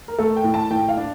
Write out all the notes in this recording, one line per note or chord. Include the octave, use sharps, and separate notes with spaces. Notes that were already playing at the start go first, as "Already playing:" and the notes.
A#4
A3 A4
G5
A2
A5
A2 G5
F5
D4